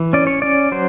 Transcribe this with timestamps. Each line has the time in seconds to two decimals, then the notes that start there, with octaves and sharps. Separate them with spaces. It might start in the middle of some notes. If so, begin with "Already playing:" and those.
Already playing: E3
0.13 C#4 D5
0.27 C#5
0.42 C#4 D5
0.72 F#3 C5